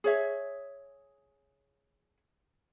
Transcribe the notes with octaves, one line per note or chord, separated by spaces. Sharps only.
G#4 C#5 E5